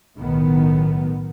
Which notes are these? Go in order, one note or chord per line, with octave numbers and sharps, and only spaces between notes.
B1 A2 D#3 F#3 B3